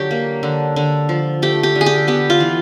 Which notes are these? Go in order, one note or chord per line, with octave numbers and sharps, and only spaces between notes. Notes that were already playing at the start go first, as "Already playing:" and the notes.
Already playing: D3 F#3 G4
A#3
D3
D3
F3
A3 G4
G4
D3
G#4
G4
B3 G4
F4
E3